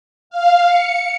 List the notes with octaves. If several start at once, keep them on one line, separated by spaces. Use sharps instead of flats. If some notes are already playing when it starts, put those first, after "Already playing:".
F5
C#7